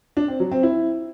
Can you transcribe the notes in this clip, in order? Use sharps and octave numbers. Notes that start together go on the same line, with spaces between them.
D4
C4
F#3
C4
E4